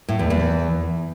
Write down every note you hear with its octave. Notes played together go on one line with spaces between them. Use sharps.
A2
E2
E2